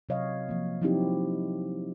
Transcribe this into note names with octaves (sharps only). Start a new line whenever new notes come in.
C3 F#3 C#5 D#5 F5
F3 A#3
F3 F#3 C4 D#4 E4 G4